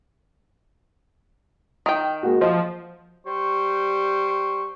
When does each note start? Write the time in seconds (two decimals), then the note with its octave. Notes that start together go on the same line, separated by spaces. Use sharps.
1.86 D#3 G5
2.23 G#3 A#3 F#4
2.41 F3 D#5
3.27 G3 C5 C#6